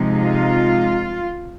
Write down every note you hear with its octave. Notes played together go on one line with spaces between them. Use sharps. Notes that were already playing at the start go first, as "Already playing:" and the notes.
Already playing: C3 F3 G#3 D#4
F4